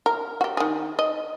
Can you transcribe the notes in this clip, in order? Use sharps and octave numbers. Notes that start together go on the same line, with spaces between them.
A#4
F#4 G4
D#3 G#4
D#5